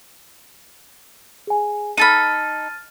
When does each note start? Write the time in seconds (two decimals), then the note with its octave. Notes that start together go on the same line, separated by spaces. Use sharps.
1.47 G#4 G#5
1.97 D#4 A4 B5 F6 A6 D#7